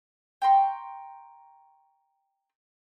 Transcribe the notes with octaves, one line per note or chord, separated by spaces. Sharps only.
G5 A#5 C6 C#6